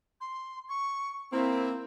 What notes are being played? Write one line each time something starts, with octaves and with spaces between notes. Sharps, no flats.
C6
C#6
A#3 C4 E4